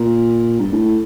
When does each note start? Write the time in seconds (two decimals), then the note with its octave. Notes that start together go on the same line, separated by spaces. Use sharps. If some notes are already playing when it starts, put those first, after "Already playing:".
Already playing: A#2
0.60 G2
0.73 A2